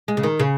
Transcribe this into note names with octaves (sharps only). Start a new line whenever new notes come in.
G#3
C#3
D#3
C#3